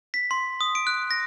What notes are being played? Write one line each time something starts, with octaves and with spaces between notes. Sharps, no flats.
B6
C6
D#6
D7
F#6
A#6